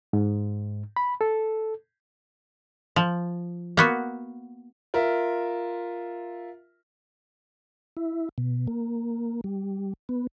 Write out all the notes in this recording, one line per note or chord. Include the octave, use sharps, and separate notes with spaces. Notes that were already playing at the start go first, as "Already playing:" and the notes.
G#2
B5
A4
F3
A#3 B3 F#4
F4 A#4 E5
E4
B2
A#3
G3
B3